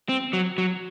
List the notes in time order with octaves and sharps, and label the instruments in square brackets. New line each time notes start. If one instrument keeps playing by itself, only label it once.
[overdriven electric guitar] C4
F#3
F#3